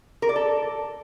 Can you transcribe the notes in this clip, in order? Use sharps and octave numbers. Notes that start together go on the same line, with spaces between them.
A#4
D5
A4